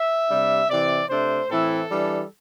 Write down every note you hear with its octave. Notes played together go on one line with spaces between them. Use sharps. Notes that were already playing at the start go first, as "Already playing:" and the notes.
Already playing: E5
C3 G3 D4
C3 E3 C4 D5
C3 A3 D4 C5
A2 E3 C4 E4 A4
E3 G3 D4